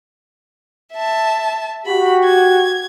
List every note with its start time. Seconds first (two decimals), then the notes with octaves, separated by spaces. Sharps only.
0.93 E5 A5
1.86 F#4 G4 B5
2.24 G#6